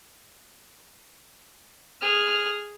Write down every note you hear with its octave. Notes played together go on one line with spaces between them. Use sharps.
G#4 F6